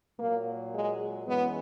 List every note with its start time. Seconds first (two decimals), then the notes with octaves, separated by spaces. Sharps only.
0.19 A#2 F#3 A#3
0.73 G#3
1.27 F#2 E3 G#3 B3